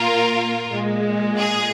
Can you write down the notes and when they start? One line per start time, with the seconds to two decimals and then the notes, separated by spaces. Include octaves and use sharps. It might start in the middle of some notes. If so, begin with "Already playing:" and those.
Already playing: A#2 A#3 F4 A#4
0.68 A#2 G#3
1.36 G#4